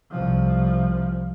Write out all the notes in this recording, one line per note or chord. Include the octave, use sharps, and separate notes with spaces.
C2 F3